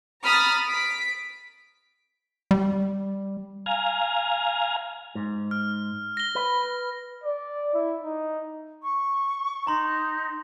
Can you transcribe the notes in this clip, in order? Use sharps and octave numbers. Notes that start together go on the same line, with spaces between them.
A#5 B5 D#6 F6 A6
B6 D7
G3
F5 G#5 A#5
G#2
F6
A#6 G7
B4
D5
E4
D#4
C#6
D#4 A#5 C6